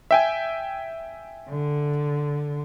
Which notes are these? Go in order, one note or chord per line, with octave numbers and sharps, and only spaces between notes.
E5 G5 G#5
D3